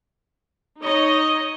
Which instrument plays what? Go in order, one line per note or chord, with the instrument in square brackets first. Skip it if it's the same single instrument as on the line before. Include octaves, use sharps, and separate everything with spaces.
[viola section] D#4 C#5 D#5